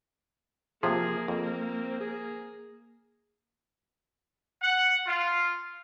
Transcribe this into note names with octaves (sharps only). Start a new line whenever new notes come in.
C3 F3 A#3 G#4
F2 C4
G#4
F#5
F4